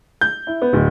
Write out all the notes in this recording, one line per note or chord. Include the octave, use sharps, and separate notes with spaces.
G6
E4
B3
D1